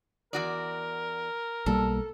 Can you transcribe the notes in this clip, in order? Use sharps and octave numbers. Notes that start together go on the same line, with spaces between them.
E2 F#4 A#4 D5
B1 G3 A#3 A4